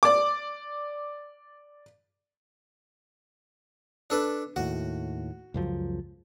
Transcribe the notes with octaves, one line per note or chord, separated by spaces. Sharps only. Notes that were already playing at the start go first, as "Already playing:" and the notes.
D5 D6
D4 A4 B4
D#2 A2 F#4
C#2 F#2 F3